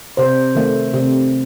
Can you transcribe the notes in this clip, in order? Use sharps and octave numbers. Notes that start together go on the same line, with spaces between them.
C3 C5
D#3 A3
C3